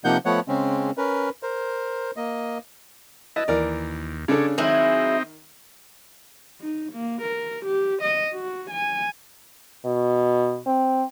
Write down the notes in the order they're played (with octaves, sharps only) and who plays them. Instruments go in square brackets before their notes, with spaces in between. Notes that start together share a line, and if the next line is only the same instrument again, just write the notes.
[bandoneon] C3 F3 A#3 D#4 F#5 G6
F3 A3 B3 C#5 F#5
C#3 G#3 C4 C#4
C#4 A#4 B4
A#4 C5
A#3 D#5
[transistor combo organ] E4 B4 A5 [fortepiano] D#5
[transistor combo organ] D#2 [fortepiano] E3 A#4 D5
[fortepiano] C#3 D4 A4 [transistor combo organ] C#5 D5
[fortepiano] D#3 [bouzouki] F#3 G#3 E4 [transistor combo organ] C4 D#4
[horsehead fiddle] D#4
A#3
A#4
G4
D#5
F#4
G#5
[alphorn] B2
C4